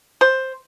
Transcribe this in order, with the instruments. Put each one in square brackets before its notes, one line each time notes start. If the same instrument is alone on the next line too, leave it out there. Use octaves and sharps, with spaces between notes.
[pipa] C5